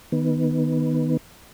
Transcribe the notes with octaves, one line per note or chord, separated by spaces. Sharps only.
D#3 B3